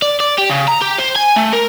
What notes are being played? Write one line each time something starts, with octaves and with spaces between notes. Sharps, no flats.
D5
D5
G4
C#3
A#5
G4
C5
G#5
A3
A#4